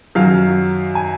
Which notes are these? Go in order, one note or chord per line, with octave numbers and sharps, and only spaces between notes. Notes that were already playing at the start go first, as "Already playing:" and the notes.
F#2 D#3 F#3 F5
G#5